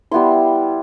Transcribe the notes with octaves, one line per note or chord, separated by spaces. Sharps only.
G3 B3 E4 C6